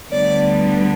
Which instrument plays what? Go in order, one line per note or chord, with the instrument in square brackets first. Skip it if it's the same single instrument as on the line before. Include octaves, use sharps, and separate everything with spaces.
[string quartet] D2 D3 G3 B3 D5